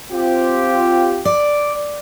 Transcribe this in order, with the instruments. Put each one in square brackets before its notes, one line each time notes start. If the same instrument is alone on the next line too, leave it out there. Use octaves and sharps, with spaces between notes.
[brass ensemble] C4 F4 G4
[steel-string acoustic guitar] D5